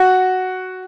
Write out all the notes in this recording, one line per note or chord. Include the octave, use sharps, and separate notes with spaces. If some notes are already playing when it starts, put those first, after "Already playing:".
Already playing: F#4